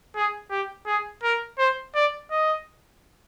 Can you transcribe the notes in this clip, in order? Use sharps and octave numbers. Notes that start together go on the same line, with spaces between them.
G#4
G4
G#4
A#4
C5
D5
D#5